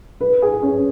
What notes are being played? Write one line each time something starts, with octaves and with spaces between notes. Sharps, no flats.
B4
G#4
C#4